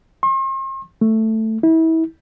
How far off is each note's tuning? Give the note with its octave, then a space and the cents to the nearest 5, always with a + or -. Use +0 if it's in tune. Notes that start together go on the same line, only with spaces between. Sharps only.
C6 +45
A3 +5
E4 -30